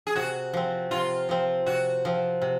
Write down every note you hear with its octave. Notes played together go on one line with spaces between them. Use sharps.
G#4
C3 F#4
F3 C4
C3 F4
F3 C4
C3 F#4
F3 C4
C3